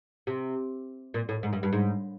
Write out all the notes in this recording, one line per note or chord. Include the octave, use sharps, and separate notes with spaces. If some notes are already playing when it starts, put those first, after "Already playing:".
C3
A#2
A2
G#2
G2
G2
G#2